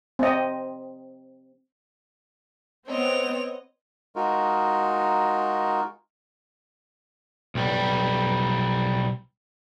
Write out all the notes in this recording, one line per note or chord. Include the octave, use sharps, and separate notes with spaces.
C4 D#5
B3 C4 C#5 D#5 F7
G#3 D#4 F4 F#4 A#4
B1 G3